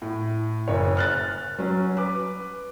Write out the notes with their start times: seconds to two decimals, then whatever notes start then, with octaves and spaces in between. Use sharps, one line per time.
0.02 A2
0.68 F#1 C#5
0.97 F6 F#6 A6
1.58 F#3 C#4
1.97 B4 D6